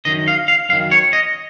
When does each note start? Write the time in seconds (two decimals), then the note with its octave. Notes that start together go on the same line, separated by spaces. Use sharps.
0.05 F#2 D#3 D#5
0.28 F5
0.48 F5
0.69 F#2 F5
0.73 D#3
0.91 C#5
1.13 D#5